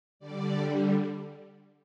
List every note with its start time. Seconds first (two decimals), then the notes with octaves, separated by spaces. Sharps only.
0.19 D3 G3 D5